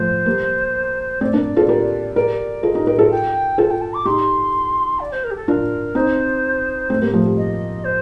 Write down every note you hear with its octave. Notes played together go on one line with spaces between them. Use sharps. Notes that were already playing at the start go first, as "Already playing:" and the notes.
Already playing: F3 A3 C5
G3 A#3
A3 C4 D5
A#3 D4
F4 A4
G4 A#4
G4 A#4 D5
F4 A4 D#5
D#4 G4
G4 A#4
F4 A4
G5
F4 A4 A5
G5
A5
D6
D#4 G4 C6
D5
C5
A#4
G4
A4
D4 F4 A#4
C4 D#4 C5
A3 C4
G3 A#3
F3 A3
G3
D#5
C5